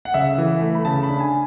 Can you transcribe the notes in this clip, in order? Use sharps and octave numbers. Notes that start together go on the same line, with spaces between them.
F#5
C#3 E5
E3
A3
B5
C#3 A5
B5
D4
G#5